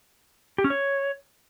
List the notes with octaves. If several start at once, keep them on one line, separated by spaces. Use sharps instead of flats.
G4
C#4
C#5